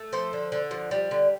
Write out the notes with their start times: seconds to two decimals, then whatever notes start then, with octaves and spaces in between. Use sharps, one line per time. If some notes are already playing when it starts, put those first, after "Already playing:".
Already playing: A3
0.13 F3 A4 C5
0.33 D3
0.52 D3
0.71 F3
0.91 G3
1.11 D3